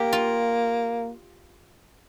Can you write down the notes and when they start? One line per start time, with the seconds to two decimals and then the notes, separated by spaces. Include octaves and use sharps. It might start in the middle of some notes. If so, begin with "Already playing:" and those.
Already playing: A#3 G4
0.13 F4